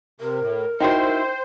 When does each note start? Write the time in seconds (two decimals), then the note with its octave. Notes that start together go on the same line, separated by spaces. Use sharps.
0.20 C3 A#4
0.40 A2
0.80 D#4 E4 F#4 C5 G5 C6